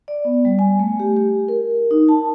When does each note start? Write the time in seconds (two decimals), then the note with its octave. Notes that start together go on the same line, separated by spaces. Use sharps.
0.08 D5
0.25 B3
0.45 G3
0.59 G#5
0.79 A3
1.00 G4
1.17 G4
1.48 A#4
1.91 D#4
2.09 A5